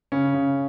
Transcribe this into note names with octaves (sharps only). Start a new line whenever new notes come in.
C#3 C#4
C#3